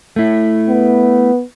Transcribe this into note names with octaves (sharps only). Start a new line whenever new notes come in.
A3 E4
B3